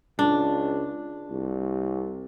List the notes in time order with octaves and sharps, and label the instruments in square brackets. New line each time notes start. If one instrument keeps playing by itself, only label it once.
[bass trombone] C#2 [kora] D4
[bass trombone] C2